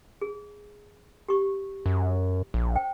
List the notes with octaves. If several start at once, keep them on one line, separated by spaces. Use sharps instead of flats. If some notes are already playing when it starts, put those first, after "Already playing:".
G#4
G4 C#6
F#2
A#1
C5 G5